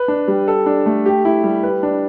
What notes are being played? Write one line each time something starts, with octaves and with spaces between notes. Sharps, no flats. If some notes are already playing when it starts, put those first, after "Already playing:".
Already playing: B4
D4
G3
A4
D4
A3
G4
E4
G3
B4
D4